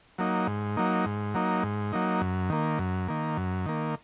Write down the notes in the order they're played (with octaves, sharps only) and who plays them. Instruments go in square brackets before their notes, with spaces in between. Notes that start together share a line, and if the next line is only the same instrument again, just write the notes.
[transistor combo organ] F#3 A#3 D#4
G#2
F#3 A#3 D#4
G#2
F#3 A#3 D#4
G#2
F#3 A#3 D#4
F#2
D#3 A#3
F#2
D#3 A#3
F#2
D#3 A#3